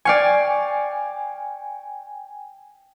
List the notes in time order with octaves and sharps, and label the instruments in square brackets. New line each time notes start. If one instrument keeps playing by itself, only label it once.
[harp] D5 F5 C#6 [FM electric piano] G5 G#5